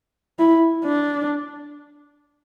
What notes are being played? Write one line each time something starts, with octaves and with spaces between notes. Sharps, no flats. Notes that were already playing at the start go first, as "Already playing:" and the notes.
E4
D4